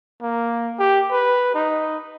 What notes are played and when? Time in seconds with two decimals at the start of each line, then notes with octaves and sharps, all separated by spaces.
0.22 A#3
0.79 G4
1.11 B4
1.55 D#4